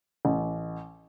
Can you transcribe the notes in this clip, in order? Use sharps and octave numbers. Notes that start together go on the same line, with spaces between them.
A1